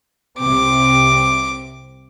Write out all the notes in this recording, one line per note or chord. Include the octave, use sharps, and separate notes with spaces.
C2 C3 C4 D6